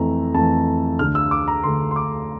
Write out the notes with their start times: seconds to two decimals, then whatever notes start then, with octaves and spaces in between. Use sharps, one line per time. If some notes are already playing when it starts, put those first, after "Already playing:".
Already playing: F2 E3 A3 A#5
0.34 F2 E3 A3 A5
0.99 D2 D3 A3 F6
1.15 E6
1.31 D6
1.48 A#5
1.63 D2 D3 A3 C6
1.91 C6
1.96 D6